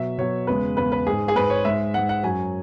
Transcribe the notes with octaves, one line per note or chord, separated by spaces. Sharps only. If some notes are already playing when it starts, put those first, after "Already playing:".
Already playing: B2 F#3 E5
B2 F#3 C#5
E2 C#3 G#3 B4
E2 C#3 G#3 B4
B4
G#2 G#3 G#4
G#4
G#2 G#3 B4
C#5
G#2 G#3 E5
G#2 G#3 F#5
F#5
F#2 F#3 G#5